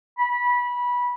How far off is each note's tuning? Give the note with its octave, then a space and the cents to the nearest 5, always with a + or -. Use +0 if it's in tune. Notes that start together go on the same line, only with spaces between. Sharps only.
B5 -20